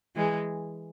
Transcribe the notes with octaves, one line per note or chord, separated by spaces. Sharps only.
E3 G#3